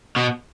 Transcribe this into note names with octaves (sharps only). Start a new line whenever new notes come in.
B2